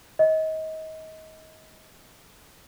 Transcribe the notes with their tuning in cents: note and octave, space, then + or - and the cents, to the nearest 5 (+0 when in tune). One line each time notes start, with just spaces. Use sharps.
D#5 +30